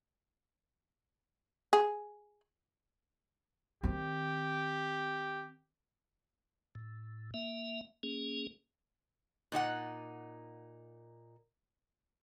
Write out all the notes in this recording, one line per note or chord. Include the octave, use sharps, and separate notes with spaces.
G#4
D#3 C4 G4
A2
A#3 E5
A#3 C#4 G#4
A#2 D#4 F#4 F#5